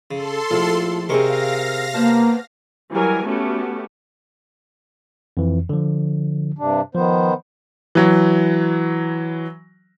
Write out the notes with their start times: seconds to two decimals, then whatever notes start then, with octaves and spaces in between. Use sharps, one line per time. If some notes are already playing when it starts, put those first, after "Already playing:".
0.11 C#3 A4 C6
0.51 A#1 A2 F4
1.09 C3 C4 G#4 A#4 D#5 F5 C#6 A#6
1.94 A#3 B3 C5 A5
2.91 E3 F#3 G3 A#4 G#5
3.26 A3 B3 C#4 F#4 G4
5.37 F2 E3
5.69 D3 F3
6.59 G2 C3 D4
6.95 D#3 F3 B3 C5
7.95 E3 F#3